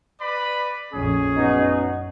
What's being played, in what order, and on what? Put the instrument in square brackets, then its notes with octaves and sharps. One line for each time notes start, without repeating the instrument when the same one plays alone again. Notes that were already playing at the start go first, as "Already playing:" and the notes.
[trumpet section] B4 D5 B5
[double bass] A#1 F2 [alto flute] C#4 [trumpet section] G#4
[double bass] F#2 [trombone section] B3 D#4 F#4